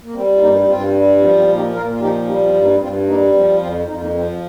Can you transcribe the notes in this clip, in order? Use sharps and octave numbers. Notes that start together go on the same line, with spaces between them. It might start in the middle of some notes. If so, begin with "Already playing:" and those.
A#3
G3 C4
F4
G2 A#3 D#4
G2 C4 F4
G3
F3 C4 F4
C4 F4
A#2
D#4 G4
A#2 F4 A#4
F4
F3 D#4 G4
G3 D#4 G4
C4 F4
G2
A#3 D#4
G2 C4 F4
G3 A#3 D#4
F3 C4
F2 C4 F4
F2 D#4
F4
A#3 D#4
F3 C4